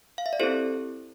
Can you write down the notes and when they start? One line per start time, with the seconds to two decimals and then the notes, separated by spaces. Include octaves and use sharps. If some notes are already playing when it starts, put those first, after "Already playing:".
0.18 F5
0.26 E5
0.33 D5
0.40 C4 E4 G4 A4 C5